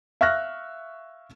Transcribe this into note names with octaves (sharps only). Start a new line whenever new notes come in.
E5 F5 C#6 F6 F#6 A#6